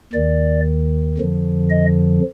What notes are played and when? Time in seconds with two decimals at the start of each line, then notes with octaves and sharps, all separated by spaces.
0.13 D#2 D#3 D5
1.18 F2 D3 F3
1.70 D#5